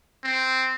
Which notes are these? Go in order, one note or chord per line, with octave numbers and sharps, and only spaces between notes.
C4